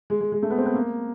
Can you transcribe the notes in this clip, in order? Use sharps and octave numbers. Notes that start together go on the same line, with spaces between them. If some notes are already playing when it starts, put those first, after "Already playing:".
G#3
G#3
G#3
A3
B3
C4
B3
A#3